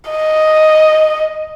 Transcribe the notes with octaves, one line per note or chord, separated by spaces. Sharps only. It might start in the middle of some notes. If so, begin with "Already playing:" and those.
D#5